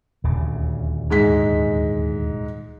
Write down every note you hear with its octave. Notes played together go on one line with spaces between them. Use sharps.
D#1 D2 C#3
G#2 G#3 B6